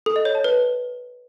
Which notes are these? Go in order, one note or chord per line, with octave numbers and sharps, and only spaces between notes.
A4
D#5
C#5
A5
B4